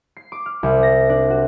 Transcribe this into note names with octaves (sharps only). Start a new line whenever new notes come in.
C7
D6
F6
C2
A#6
D4
F#4